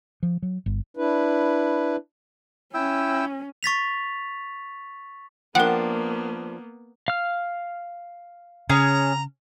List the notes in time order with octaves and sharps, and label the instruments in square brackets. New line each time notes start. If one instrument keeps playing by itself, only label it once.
[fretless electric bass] F3
F#3
G1
[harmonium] D4 E4 B4
[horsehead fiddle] C#4 [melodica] E4 G5 E6
[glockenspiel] C#6 A6 B6 F7
[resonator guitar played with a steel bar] F3 D4 [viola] A#3 B3 [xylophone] A#4 G5 [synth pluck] F#5
[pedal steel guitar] F5 F6
[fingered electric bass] C#3 [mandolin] C#4 G#4 [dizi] A#5